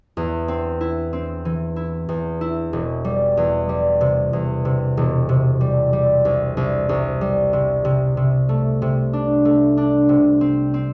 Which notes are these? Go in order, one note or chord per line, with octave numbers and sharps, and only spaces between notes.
E2
C4
E4
C4
E3
E4
E2
E4
E1
G3
E2
G3
C3
E2
C3
E1
C3
G3
G3
C2
C2
C2
G3
C3
C3
C3
A3
C3
D4
A3
D4
C3
C4
C4